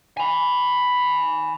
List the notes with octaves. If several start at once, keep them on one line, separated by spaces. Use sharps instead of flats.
G#5 B5